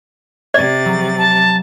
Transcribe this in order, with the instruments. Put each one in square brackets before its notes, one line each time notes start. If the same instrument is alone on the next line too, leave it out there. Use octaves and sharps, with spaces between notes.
[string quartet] C3 A6 [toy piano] D5
[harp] F#3
[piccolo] A5